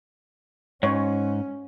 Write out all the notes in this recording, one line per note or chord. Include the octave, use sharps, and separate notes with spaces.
G#2 C#4 C#5